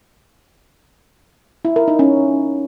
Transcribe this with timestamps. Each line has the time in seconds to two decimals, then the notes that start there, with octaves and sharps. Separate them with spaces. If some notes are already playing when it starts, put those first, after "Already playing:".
1.65 E4
1.76 A#4
1.88 D#4
1.99 C#4